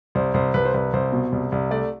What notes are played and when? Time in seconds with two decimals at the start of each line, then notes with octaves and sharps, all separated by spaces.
0.15 C2 C5
0.34 C2 C5
0.54 C2 B4
0.65 C5
0.74 C2 B4
0.93 C2 C5
1.12 B2
1.32 C2
1.52 C2
1.71 A3 D5